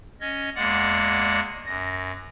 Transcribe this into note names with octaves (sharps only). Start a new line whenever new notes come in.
C#4 D#5 G#6
E2 G#3 A#3 D5 F#5
F#2 A#6